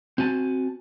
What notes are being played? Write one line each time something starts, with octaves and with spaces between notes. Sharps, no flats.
C4 F#4 G#5 A5